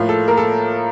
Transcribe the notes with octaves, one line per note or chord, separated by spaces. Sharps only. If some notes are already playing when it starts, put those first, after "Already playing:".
Already playing: A2 F3 A#3 F4 F5
A4
A#3 A#4
A4